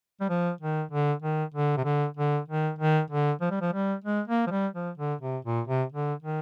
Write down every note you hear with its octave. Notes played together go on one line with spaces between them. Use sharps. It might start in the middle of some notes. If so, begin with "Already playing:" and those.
G3
F3
D#3
D3
D#3
D3
C3
D3
D3
D#3
D#3
D3
F3
G3
F3
G3
G#3
A#3
F3
G3
F3
D3
C3
A#2
C3
D3
D#3